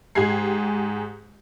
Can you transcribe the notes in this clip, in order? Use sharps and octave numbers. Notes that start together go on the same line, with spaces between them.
G#2 G#3 G4 G#4 G#6 C7